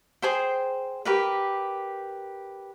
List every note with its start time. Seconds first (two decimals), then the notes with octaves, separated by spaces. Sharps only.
0.22 G#4 C5 G5
1.05 G4 A#4 B4